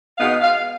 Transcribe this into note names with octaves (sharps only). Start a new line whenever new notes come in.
B2 G#3 B3 D#4 F5
F5